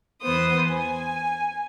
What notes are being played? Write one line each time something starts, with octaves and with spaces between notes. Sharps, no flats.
E2 E3 B3 C5 D#6
G#5